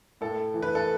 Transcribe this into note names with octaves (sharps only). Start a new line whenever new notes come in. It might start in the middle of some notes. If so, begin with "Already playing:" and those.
A2 A4
E3
B4
A4